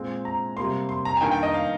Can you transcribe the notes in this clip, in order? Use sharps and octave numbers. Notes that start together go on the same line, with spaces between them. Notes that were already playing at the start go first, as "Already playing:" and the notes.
Already playing: A#2 G#3 C4 G#5
A#5
C3 G3 A#3 C6
C6
A#5
G#5
G2 D#3 A#3 G5
G5
D#5
F5